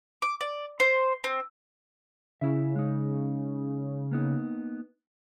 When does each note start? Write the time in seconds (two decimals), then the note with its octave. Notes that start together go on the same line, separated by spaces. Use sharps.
0.22 D6
0.41 D5
0.80 C5
1.24 C4
2.41 C#3 E4 E5
2.76 G#3 D#4
4.11 A#3 B3 D#4